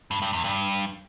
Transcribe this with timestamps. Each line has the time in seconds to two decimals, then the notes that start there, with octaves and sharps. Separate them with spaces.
0.11 G2
0.22 G2
0.33 E2
0.44 G2